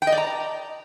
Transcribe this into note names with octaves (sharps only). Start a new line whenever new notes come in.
G5
D#5
D5
A#5